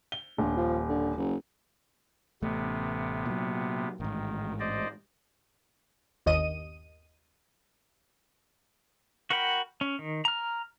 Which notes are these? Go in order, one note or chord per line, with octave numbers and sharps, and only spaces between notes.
G7
D#1 G2
F3
D3
F#1
A1 C3 A3 B3
A#2 F#3
A1 G#2 D#3
C5 D5 D#5
G1 D#2 D#5 D#7
F#4 A#4 F#5 G5 B5
C#4
D#3
A#5 F6